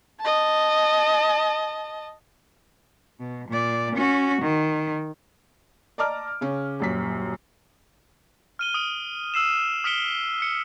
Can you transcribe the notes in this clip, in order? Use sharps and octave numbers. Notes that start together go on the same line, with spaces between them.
D#5 A5
B2
A#2 D5
C#4 F#4
D#3
D5 D#5 A5 A#5 D6 F6
C#3 C#4
D#1 F#2 B6
F6 D#7 G7
D#6 D7
E6 C7 E7
D#6 F6 B6 C#7 D7 G7
C#7